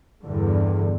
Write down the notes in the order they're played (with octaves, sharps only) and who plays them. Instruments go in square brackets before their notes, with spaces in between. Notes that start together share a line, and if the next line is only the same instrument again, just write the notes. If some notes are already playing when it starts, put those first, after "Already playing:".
[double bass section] E2 G2 D3